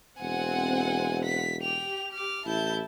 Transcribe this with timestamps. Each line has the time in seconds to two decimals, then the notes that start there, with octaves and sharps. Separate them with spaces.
0.20 E1 C4 F#5 G#5
1.24 B6
1.62 G4 G5 F7
2.13 D6 F6
2.46 A1 E4 A5 G6